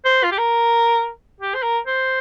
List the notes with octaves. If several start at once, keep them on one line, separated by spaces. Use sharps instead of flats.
C5
F4
G4
A#4
G4
C5
A#4
C5